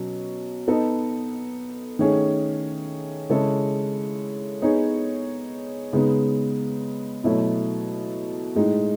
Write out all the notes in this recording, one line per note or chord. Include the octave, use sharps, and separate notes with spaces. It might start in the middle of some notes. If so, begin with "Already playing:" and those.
Already playing: B2 F#3 C#4
B3 D#4 A4 D#5
D#3 A3 C#4 G#4
C#3 G#3 C#4 E4 A4
B3 D#4 G#4 C#5
C#3 G#3 B3 D#4
B2 F#3 A3 E4
A2 G#3 D#4